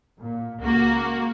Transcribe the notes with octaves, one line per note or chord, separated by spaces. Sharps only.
A#2
C#2 A#3 F#4